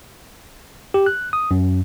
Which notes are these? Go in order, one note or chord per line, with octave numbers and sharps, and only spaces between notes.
G4
F#6
D#6
F#2